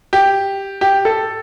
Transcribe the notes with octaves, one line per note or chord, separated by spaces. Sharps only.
G4
G4
A4